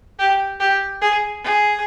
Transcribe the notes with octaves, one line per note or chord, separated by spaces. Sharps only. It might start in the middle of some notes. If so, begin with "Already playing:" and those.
G4
G4
G#4
G#4